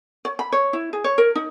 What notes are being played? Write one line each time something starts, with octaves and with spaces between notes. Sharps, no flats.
C#5
B5
C#5
E4
G#4
C#5
A#4
D#4